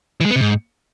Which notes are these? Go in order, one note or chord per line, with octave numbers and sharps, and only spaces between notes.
E3
G#3
B3
C3
G#2